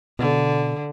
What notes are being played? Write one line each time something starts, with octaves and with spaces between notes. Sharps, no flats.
B2 D3